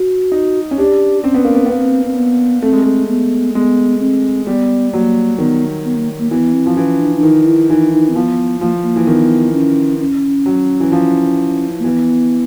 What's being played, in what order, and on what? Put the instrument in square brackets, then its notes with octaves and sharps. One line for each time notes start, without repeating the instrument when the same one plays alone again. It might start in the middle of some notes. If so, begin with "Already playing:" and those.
Already playing: [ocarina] F#4
[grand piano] D#4
C#4
[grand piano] D4 [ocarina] G4
[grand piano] C4 [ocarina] C#4
[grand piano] B3
A#3
B3
B3
[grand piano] A#3 [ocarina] C4
[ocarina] C4
B3
[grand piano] A3 [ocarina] C4
[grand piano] G#3
A3
[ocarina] B3
[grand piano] G#3 [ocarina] B3
[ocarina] C4
[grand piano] G3 [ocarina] B3
[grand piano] F#3 [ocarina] A#3
[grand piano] D#3 [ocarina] B3
[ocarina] B3
A#3
A#3
[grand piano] E3 [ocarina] B3
[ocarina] C4
[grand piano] F3
[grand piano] E3 [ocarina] C#4
[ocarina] D4
D4
[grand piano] D#3 [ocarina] D#4
[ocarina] E4
[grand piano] E3 [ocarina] D#4
[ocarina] D#4
C4
[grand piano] F3 [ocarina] B3
[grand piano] F3 [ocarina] A#3
[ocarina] A#3
[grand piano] E3
[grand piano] D#3 [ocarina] B3
[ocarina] C#4
C#4
[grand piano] F#3
E3
F3
[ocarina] A#3
[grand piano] E3 [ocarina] B3